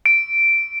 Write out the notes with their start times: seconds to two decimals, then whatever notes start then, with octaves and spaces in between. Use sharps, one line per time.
0.06 D7